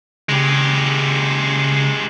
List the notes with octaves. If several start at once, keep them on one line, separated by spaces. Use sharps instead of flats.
C#3 G#3 G4